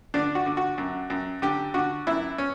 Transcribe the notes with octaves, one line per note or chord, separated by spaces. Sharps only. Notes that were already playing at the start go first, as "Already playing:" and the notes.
D3 D4
F#4
D3
F#4
F#2
F#2
D3 G4
D3 F#4
F#2 E4
C#4